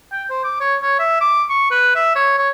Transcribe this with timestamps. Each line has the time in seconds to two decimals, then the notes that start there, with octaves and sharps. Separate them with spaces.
0.12 G5
0.30 C5
0.44 D6
0.60 C#5
0.82 C#5
0.99 E5
1.21 D6
1.49 C#6
1.71 B4
1.95 E5
2.15 C#5
2.38 C#5